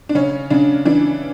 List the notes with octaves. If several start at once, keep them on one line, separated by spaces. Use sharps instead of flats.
D4
C#3 C#4
C#3 D4
E3 D4